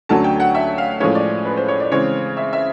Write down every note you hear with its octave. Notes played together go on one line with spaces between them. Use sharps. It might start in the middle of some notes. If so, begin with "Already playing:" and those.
D2 D3 F#3 A3 C#4 A5
G5
F#5
E5
F5
A2 F3 G#3 C#4 C#5
D5
B4
C5
C#5
D5
C#3 E3 G#3 C4 C#5
E5
E5